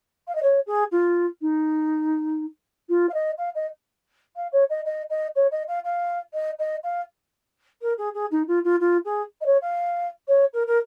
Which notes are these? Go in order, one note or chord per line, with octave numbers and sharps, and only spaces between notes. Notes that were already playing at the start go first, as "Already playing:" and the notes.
F5
D#5
C#5
G#4
F4
D#4
F4
F5
D#5
F5
D#5
F5
C#5
D#5
D#5
D#5
C#5
D#5
F5
F5
D#5
D#5
F5
A#4
G#4
G#4
D#4
F4
F4
F4
G#4
D#5
C#5
F5
C#5
A#4
A#4